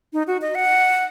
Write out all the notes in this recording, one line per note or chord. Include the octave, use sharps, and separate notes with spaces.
D#4
F#4
D#5
F#5